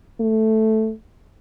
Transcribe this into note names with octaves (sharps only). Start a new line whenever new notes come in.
A3